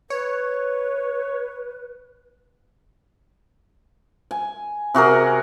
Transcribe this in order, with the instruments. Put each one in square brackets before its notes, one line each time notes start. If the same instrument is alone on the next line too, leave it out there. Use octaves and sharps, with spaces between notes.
[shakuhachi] B4 [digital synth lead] C#5
[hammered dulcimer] G#5
C3 F#4 G#4 A#4